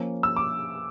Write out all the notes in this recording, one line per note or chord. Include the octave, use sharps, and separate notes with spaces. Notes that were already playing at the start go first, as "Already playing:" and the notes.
Already playing: F3 A#3 C#4
E6
D6